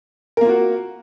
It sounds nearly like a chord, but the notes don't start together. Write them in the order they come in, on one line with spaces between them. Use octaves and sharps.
A#4 A#3 F4 F#4